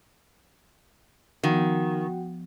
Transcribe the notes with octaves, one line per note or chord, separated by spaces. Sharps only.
D#3 F3 B3 F#4 F#5 G5